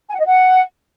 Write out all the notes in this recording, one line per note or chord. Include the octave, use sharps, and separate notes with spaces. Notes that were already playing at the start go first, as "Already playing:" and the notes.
G#5
F#5
D#5
F#5